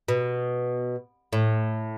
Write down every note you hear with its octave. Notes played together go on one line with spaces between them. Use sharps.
B2
A2